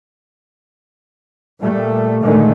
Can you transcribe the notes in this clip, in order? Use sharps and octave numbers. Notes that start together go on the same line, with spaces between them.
A#2 G3 A3
A#2 D3 D#3 G#3 A3